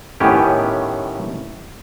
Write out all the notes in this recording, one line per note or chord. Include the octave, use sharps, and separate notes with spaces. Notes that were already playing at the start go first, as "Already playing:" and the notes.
A2 D#3 B3 C#4 G4